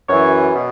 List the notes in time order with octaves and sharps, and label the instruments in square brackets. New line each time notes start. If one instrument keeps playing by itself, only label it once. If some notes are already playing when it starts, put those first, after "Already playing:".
[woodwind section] F#2 E3 C#5
B2